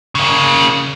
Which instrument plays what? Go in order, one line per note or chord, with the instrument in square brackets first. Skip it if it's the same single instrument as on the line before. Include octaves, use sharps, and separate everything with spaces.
[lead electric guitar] C#3 A#3